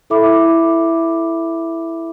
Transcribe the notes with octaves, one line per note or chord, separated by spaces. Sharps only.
E4 A4 E5 B5 D6